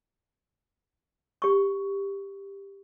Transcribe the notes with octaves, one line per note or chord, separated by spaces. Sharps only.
G4 C#6